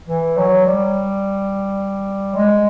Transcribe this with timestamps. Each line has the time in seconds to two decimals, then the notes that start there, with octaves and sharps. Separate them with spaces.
0.09 E3
0.37 F#3
0.65 G3
2.35 G#3